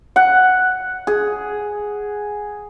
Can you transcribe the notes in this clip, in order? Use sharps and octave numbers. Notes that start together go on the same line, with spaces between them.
F#5
G#4